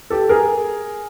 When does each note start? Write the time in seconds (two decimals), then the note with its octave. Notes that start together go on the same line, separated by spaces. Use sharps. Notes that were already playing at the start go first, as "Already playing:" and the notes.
0.10 G4 A4
0.29 G#4 A#4